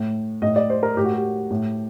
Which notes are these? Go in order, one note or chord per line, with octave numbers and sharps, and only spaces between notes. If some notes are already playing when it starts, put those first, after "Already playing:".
Already playing: A2
A2 D#5
D5
C5
A#4
A2 G4
F#4
G4
A2